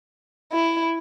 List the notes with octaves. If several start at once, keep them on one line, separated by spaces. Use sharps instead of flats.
E4